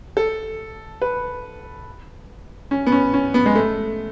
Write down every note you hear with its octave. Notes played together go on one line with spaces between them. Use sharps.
A4
B4
C#4
B3
C#4
C#4
B3
G#3
A3